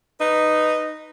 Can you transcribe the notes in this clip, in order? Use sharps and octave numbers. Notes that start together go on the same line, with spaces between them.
D#4 B4 D#5